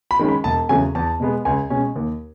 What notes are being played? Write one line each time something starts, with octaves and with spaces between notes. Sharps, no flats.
B5
D#3 G#3 C#4
B5
E1 A5
E2 C#3 F#3 A3 G#5
E2 A5
B2 G#3 B3
C#2 G#5
B2 G#3 C#4
D#2